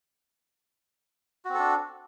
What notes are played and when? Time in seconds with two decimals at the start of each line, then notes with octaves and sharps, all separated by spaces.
1.45 F#4
1.50 C4
1.55 A4
1.59 D4